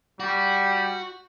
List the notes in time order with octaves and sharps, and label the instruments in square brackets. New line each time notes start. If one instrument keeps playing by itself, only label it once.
[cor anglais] G3 [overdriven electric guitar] F#4